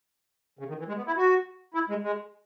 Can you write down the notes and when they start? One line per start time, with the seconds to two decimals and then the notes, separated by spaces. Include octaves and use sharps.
0.59 C#3
0.69 D#3
0.79 E3
0.88 G#3
0.98 B3
1.07 E4
1.17 F#4
1.74 E4
1.89 G#3
2.03 G#3